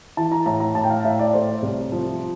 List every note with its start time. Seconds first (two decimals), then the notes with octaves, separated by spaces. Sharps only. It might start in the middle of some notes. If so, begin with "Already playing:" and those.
0.17 E3 A5
0.32 A#5
0.46 A2 A#5
0.60 A#5
0.75 A2 A5
0.84 G5
0.90 F5
1.04 A2 E5
1.19 D5
1.34 A3 C5
1.62 C2
1.92 F3